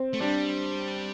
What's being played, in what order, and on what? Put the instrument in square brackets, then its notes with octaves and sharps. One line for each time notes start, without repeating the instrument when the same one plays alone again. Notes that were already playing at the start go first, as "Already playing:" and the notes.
Already playing: [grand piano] C4
[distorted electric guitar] A3
[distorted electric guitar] G3 [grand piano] D4